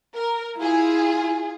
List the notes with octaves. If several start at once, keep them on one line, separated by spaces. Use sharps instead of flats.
A#4
E4 F4 G#4